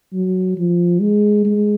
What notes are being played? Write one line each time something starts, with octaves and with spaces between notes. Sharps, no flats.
F#3
F3
G#3
G#3